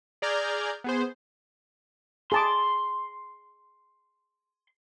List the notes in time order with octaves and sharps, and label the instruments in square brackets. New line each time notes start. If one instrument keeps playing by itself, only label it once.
[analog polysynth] G#4 D5 A#5 F6 G6 G#6
B3 G#4 C5
[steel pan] G#4 A5 D6 [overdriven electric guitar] C6